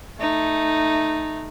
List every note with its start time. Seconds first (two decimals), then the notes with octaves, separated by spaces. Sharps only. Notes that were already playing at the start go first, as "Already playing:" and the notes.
0.19 A3 D#4